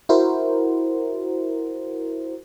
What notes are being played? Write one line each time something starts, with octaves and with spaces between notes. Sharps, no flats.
E4 F#4 A#4 C5